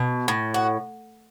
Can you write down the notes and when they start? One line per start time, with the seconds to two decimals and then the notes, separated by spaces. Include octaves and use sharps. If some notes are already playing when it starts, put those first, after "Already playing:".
Already playing: B2
0.28 A2
0.54 F#4